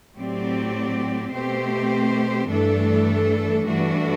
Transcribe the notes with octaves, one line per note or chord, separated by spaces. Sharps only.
A2 F#3 C4 G4 D5
B2 A3 C4 G4 C5
G2 E3 A3 D4 A4
G2 E3 A3 D4 F#4